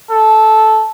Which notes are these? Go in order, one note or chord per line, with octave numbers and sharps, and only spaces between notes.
A4